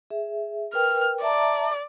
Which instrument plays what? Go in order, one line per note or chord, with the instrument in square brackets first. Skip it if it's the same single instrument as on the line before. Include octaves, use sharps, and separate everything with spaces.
[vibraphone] G#4 E5
[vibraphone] A#4 B4 G5 [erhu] F6
[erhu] D5 [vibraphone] E5 A5 A#5